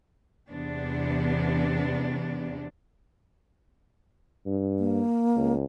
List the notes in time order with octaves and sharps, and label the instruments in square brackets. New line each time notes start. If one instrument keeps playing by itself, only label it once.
[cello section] E2 C3 B3 D4
[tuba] G2
[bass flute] A#3
[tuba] C#2